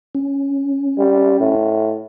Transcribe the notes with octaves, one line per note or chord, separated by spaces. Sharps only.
C#4
G3
A2